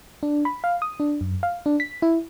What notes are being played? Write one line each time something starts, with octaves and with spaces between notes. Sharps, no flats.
D4
B5
F5
D#6
D4
F#2
F5
D4
B6
E4